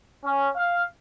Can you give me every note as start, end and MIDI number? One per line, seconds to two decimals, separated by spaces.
0.24 0.49 61
0.57 0.83 77